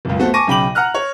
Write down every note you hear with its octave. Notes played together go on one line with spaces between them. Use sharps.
F#1 C#2
A3 B3 F#4 A4 C5
G#5 A5 C#6 D6 A#6 D#7
B1 C#3 G5 B5 D6 F#7
F#5 A#5 F6 F#6
C#5